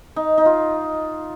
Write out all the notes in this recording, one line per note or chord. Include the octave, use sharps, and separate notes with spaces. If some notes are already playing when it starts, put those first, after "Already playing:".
D#4
D#4
F4